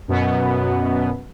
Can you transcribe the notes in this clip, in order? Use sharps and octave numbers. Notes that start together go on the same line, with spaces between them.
F#2 B2 B3